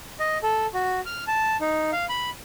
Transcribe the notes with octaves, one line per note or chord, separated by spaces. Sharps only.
D#5
A4
F#4
F6
A5
D#4
F5
B5